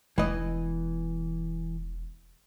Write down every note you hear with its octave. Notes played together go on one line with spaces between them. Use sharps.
E1 E3 B3 D#5